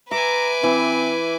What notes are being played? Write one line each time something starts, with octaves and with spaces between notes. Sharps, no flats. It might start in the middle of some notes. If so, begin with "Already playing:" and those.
B4 E5 G#5 A#5 D6
E3 C4